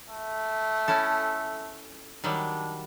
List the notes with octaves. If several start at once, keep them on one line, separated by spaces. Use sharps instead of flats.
A3
C#4 E4 A4
D#3 F#3 G3 D4